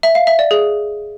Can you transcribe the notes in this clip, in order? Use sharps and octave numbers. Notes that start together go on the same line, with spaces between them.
E5
F5
E5
D5
G#4